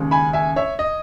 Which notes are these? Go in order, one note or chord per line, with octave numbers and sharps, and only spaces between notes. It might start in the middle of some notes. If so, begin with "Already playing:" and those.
Already playing: D#2 C#3 G#3
G#5 B5
E5 G#5
C#5 E5
D#5